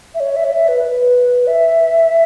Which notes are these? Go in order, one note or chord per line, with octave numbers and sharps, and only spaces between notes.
E5
C#5
E5
C#5
E5
B4
B4
E5